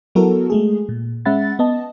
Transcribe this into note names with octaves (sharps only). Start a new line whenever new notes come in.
F#3 B3 E4 F#4 A4 A#4
G#3 A3 G#4
A#2
G#3 C#4 E5 F#5 B5 A6
B3 D#5 A5